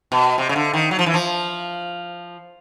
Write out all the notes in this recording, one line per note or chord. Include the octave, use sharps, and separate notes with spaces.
B2
C3
C#3
D3
D#3
F#3
F3
E3
F3